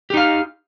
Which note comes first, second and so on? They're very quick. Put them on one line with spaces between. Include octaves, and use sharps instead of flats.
G4 D#4 F5